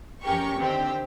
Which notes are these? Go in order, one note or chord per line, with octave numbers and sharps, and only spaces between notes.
F2 C#4 G4 A#4 C#6
D3 D#3 C4 G4 C5